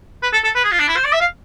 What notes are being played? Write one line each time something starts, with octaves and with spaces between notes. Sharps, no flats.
B4
A4
A4
B4
G#4
F4
D4
E4
C5
D5
E5
F5